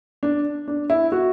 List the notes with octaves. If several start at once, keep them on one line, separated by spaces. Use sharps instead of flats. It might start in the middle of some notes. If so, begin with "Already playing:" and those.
D4
D4
E4
F#4